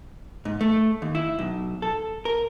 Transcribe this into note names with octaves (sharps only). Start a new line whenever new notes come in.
G#2
A3
D#2
E4
B1
A4
A#4